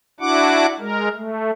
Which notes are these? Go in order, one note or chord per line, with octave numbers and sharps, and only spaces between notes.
D4 E4 F#4 F#5 D6
G#3 A#4
A3